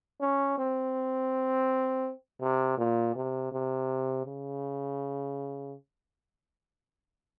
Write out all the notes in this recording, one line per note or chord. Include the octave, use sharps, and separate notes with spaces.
C#4
C4
C3
A#2
C3
C3
C#3